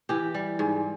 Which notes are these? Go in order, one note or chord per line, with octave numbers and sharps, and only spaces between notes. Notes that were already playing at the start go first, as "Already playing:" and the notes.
E3 G4
G3
G#2